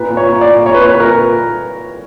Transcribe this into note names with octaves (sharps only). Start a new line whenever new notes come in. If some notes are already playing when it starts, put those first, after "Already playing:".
Already playing: A#2 B4
A#2
C#5
A#2
D5
A#2
A#2 C#5
B4
A#2 C#5
B4
A#4
A#2